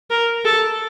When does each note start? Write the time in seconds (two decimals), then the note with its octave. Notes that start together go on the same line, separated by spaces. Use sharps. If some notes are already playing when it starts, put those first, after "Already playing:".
0.10 A#4
0.45 A4